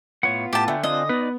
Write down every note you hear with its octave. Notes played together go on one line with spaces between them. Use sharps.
A2 B3 F4 C#5 F#5
A2 G4 A5
D3 A3 E5 G5 G#5
C4 D4 F4 D#5
B3 D#4 B4 D5